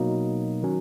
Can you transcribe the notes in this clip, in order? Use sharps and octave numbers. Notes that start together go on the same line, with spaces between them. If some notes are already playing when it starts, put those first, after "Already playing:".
Already playing: B2 F#3 A#3 D#4
D#3 F#3 C#4